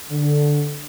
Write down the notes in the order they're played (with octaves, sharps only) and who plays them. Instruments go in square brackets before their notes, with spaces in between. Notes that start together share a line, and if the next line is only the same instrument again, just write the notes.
[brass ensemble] D3